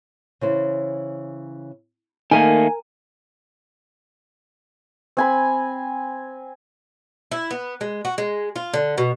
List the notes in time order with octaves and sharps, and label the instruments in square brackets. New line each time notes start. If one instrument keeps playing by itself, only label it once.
[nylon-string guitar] C#3 E3 C5
[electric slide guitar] D#3 A3 A#3 [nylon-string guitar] A#4 [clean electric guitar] G#5
[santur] C4 G#5 B5
[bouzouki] E4
B3
G#3
F#4
G#3
F4
D3
B2